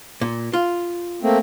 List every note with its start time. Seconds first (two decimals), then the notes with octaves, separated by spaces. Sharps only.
0.21 A#2
0.53 F4
1.22 A3 A#3 C4